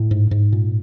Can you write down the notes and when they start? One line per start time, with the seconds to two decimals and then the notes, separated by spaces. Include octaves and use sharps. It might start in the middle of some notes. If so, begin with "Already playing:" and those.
Already playing: A2
0.11 G#2
0.31 G#2
0.52 A#2